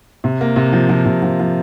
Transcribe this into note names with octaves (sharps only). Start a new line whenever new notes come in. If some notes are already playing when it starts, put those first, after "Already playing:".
C3
A#3
C3
F3
F3
C3
F3
F3